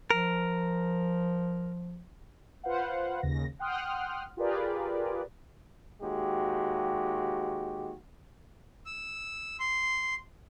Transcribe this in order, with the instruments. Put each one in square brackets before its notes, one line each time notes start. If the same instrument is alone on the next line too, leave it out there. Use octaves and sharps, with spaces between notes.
[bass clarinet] F3 [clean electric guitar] A#4
[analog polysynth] F4 B4 C5 F5 F#5
D#2 C#3 A#6
F#5 G5 C6 D#6 F6 F#6
F4 G4 G#4 A#4 B4 D5
[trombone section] D#2 G#3 F#4 G4
[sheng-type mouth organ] E6
C6